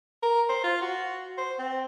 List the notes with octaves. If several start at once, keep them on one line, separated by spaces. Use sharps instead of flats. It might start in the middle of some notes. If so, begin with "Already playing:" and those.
A#4
C5
F4
F#4
C5
C4